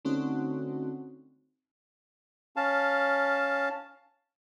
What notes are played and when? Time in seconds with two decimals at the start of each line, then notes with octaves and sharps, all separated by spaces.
0.05 D3 A3 C4 C#4 D#4 F#4
2.56 C#4 F5 A5